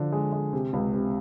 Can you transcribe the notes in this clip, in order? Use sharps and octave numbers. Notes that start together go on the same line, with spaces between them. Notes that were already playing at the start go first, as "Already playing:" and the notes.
Already playing: D3 F3
G#3
G#3
C3
C#2
C3